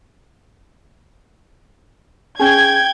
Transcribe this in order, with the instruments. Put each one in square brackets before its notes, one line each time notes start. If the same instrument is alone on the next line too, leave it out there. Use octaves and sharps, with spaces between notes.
[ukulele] C#4 G#4 [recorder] G5 [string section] G#6